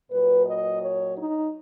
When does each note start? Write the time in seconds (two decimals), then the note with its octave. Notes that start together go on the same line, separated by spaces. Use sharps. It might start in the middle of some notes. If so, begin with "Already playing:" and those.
0.11 A#2 F#3 B4
0.45 D#5
0.82 C#5
1.16 D#4